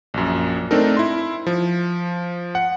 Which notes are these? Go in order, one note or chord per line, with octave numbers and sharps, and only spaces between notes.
A#1 F#2
A3 C4 D4 D#4 A4 A#4
E4 C6
F3
F#5